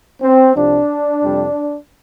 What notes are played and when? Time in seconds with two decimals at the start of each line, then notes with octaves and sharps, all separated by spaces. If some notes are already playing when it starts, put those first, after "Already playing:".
0.22 C4
0.56 C2 C3 F3 D4
1.23 F2 C3 G3